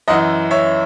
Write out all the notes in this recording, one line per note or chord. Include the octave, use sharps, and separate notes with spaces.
F#2 E3 D#5 F#5
C#5 E5